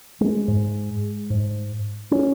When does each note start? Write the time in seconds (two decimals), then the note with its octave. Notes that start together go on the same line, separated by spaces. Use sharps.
0.21 G#3
0.48 G#2
1.30 G#2
2.11 C#4